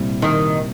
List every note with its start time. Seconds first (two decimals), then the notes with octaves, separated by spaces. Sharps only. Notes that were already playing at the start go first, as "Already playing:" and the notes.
Already playing: C2 A#2 G3 C4 E4
0.22 D#3